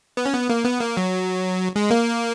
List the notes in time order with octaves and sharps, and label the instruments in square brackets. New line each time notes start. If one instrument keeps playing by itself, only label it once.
[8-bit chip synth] B3
C#4
B3
A#3
B3
A#3
F#3
G#3
A#3